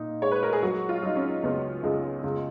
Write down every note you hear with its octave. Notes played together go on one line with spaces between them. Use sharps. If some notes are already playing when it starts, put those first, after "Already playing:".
Already playing: A#2 D#4
G#3 C#5
B4
A#4
G#4
F#3 F#4
F4
F#3 D#4
C#4
C#2 B3
C#2 G#3
C#2